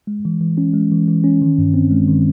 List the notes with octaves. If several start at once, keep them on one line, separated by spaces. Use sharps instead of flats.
G#3
E3
E3
C#4
G#3
E3
E3
C#4
D#3
G2
C4
G#3
D#3